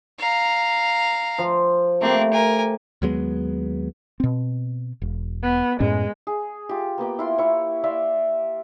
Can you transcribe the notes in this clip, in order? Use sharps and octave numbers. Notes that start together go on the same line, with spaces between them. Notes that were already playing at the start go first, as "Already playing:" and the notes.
F5 A#5
F3
A3 A#3 C4 G4
A#4 G#5
D#2 F#3 G#3 B3
B2 C4
E1
B3
F#2 A2 G#3 C#4
G#4
F4 G4
A#3 B3 G4 G5
E4 F4 C6
E4 C#5
D5 E5 F5 C6